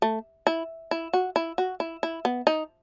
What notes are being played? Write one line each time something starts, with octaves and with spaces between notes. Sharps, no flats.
A3
E4
E4
F#4
E4
F#4
E4
E4
B3
D#4